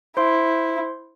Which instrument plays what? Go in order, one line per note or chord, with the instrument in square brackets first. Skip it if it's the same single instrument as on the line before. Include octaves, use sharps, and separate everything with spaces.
[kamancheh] E4 [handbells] C5 C6